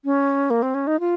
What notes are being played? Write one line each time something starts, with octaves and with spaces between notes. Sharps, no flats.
C#4
A#3
C4
C#4
D#4
F4